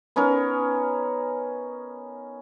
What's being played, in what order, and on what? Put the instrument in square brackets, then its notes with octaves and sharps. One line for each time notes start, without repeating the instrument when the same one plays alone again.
[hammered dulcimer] B3 C#4 D#4 A#4